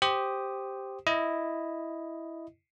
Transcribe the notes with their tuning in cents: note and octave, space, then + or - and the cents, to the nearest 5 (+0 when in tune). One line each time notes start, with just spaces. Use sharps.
G4 +0 C5 +0 D#6 +0
E4 +0 D#5 +0